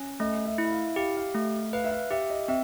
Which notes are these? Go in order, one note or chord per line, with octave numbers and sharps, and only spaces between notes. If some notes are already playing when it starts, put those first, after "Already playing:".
Already playing: C#4
A3 D#5
E5
E4
E5
F5
G4 F5
F5
A3
B4 F5
E5
F5
G4 E5
D#5
C4 E5